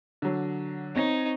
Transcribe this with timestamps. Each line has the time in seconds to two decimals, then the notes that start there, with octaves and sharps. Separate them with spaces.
0.22 D3 F#3
0.96 C4 D#4 C#5 A#6